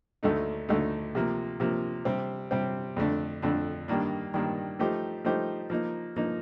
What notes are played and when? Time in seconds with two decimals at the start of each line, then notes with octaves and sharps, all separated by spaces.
0.23 D2 D3 A3 D#4
0.69 D2 D3 A3 D#4
1.15 C3 F3 A#3
1.60 C3 F3 A#3
2.05 C3 G3 C4
2.51 C3 G3 C4
2.96 F2 D3 A3 D4
3.42 F2 D3 A3 D4
3.88 G2 D#3 A#3 D4
4.34 G2 D#3 A#3 D4
4.79 F3 A3 D#4 G4 C5
5.25 F3 A3 D#4 G4 C5
5.70 F3 A#3 D#4
6.16 F3 A#3 D#4